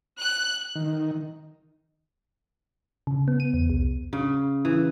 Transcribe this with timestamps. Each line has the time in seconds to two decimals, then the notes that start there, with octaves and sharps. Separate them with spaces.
0.18 F#6
0.75 D#3
3.07 C#3
3.28 B3
3.40 D#7
3.54 E2
3.70 C2
4.13 C#3
4.65 E3